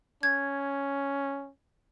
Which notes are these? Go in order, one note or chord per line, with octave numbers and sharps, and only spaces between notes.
C#4 G#6